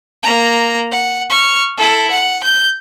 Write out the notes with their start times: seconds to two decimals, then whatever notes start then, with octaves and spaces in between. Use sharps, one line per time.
0.23 A#3 A#5
0.92 F#5
1.29 C#6 F6
1.77 E4 A4
2.11 F#5
2.43 G6